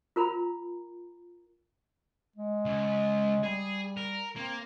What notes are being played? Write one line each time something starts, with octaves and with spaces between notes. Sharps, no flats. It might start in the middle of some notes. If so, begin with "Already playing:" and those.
F4 A#4 A#5 B5
G#3
C#2
G3 G#4
A#4
A#3 C4